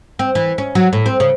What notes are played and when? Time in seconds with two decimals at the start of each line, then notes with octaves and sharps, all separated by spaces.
0.19 C4
0.35 E3
0.58 C#4
0.75 F#3
0.93 A2
1.06 C4
1.20 C#3